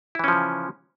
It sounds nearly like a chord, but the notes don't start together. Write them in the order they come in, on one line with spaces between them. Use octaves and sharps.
E4 E3 C#4 F3 C#3